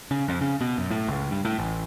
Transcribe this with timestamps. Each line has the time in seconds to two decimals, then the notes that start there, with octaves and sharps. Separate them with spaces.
0.11 C#3
0.28 F2
0.41 C#3
0.61 B2
0.78 F#2
0.90 A2
1.08 C#2
1.31 G2
1.45 A2
1.59 A1